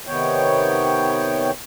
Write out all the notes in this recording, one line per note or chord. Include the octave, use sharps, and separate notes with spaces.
C3 D#3 B3 C#5 G5